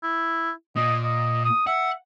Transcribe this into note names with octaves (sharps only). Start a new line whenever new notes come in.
E4
A#2 D#5
D#5
D#6
E5 F#5